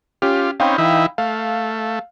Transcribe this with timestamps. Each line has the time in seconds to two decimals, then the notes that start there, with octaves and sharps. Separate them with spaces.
0.22 C#4 F4 G4
0.60 C4 C#4 D#4 F5 G5 B5
0.78 E3 D#4 E4
1.18 A3 F5